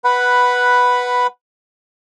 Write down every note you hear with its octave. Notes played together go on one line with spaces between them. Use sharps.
B4 F#5 B5